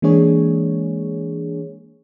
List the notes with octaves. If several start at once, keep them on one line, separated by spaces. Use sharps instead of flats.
E3 G#3 A#3 D4 G#4 C#5